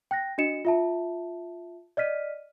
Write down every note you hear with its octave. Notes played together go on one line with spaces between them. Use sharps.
G5 F#6 A#6
D4 F#4 D#5 C#7 E7
F4 E5 A5
D5 D#5 F6 B6 D#7